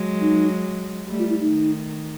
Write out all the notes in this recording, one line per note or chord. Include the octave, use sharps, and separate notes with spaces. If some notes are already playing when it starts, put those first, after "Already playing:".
Already playing: F#3 G#3
D#4
G3 A3
F4
E4
D#4
D#3